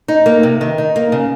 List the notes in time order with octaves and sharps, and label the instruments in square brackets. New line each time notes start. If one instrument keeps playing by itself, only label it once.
[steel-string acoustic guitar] D#4
A#3
C3
D#3
D#4
A#3
C#3